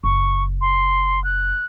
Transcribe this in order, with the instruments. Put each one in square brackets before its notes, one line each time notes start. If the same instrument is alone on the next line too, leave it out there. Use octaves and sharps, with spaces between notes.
[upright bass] F#1 [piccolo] C#6
[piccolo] C6
F#6